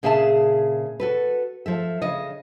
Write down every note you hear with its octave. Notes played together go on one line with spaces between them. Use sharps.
A#2 C#3 G#4 E5 G5 A5
F#4 A4 B4
F3 A4 E5
C#3 D#5